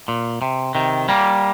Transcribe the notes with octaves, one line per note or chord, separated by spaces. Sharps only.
A#2
C3
C3 D#3
G3 A#3